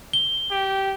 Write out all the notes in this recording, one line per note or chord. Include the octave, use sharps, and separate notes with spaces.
G7
G4